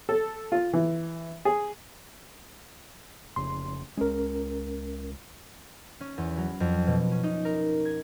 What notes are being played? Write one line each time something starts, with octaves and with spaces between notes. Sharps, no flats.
A4
F4
E3
G#4
F1 C#3 C6
C#2 G#3 C#4 A#4
C#4
E2
F#3
F2
B2
C#4
D#4
A#4
G#6